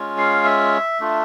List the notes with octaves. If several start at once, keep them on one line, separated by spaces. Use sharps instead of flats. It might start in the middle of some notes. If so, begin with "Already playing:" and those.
Already playing: G#3 C#4 F4
F5
E5
A3 D4 F4